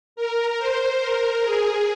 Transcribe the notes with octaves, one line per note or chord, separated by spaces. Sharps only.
A#4
C5
A#4
G#4